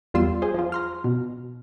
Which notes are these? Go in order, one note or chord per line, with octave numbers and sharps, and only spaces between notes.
E2 G3 F4 C6 E6
G#4 C5
F3 F4
A#5 C6 F6
B2